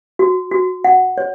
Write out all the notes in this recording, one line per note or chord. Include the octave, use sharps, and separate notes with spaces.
F#4
F#4
F#5
C#5